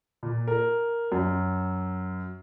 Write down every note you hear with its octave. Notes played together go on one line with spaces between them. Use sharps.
A#2
A#4
F#2